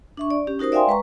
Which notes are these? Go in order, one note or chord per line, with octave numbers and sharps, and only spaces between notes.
D4 E5 C#6
D5
C#4 G4
D#4 F#4 A#4 C5 D#6
D5 E5 F5 G5 G#5 C6
G#3 B4 A#5 C#6